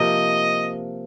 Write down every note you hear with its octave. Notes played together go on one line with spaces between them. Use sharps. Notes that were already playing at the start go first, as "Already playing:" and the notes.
Already playing: C3 F3 A#3 D#5